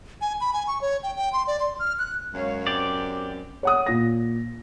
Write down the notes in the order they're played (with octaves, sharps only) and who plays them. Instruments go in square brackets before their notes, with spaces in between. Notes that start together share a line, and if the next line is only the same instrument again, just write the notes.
[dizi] G#5
B5
G#5
C#6
C#5
G5
G5
C6
D5
C6
F6
F#6
[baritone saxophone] F#2 [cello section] G#3 C#5 F5
[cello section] C4 [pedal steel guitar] G4 D5
[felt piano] C#5 F#5 D#6
A#2 A#6